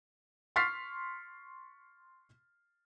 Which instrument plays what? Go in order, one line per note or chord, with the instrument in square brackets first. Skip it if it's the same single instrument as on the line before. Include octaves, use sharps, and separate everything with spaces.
[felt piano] C6 C#6 F6 A6 B6 C7